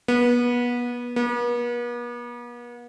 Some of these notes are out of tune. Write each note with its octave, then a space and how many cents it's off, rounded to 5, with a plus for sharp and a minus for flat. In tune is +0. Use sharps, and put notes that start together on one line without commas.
B3 -25
B3 -45